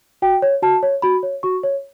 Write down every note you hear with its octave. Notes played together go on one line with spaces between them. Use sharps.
F#4 G5
C#5
F#4 A5
C#5
F#4 B5
C#5
F#4 C#6
C#5